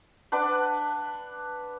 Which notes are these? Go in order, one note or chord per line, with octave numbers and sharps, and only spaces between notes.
D4 B4 F#5 D6